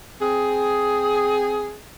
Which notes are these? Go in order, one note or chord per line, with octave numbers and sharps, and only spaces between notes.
C4 G#4